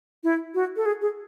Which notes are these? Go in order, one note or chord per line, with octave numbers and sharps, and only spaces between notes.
E4
F#4
A4
G#4
G#4